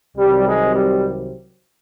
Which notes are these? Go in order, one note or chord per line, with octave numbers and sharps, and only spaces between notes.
C2 C3 D#3 F#3 G3
G#3
G3